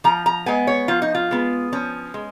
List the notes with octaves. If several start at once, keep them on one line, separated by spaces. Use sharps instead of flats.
F3 A#5
A#5
G#3 B3 G#5
C#5
F3 F4
D#4
F4
G#3 B3
F3 C#4
G#3